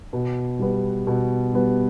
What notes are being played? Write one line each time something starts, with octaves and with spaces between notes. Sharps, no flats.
B2
G3 B3
B2
G3 B3